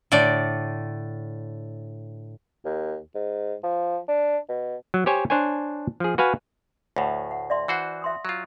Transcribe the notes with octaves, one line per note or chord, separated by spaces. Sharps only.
A2 D3 D5
D#2
G#2
F3
D4
B2
F#3
G4 C5 C#5 G#5
D4 C5 C#5 G#5
F3 G#4
F#4 B4 F5 G#5
D2 A2 C#5 F#5 B5
F#5
D5 E5 C6
E3 F#4 C5 F#5
E5 C6 D#6
F#3 F4